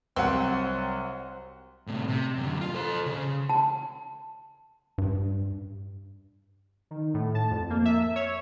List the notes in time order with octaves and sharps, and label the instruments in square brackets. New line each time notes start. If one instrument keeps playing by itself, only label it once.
[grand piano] C2 F#3 F#5 [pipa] C4
[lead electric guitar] A2 C3
C3
F#2 D3
F4
A4 C5
C#3
[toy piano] A5
[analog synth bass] G2
[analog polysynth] D#3
A2
A5
F2
A#3
E5
C#5